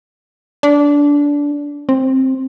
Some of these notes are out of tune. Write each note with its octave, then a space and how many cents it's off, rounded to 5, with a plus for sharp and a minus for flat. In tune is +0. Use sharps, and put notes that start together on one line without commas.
D4 -20
C4 +10